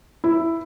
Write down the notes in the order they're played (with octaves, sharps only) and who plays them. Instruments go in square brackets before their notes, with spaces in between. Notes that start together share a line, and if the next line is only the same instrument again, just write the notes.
[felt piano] E4